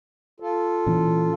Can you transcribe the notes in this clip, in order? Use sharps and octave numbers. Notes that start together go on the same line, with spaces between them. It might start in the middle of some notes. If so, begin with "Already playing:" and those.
F4 A4
A#2 E3 C#4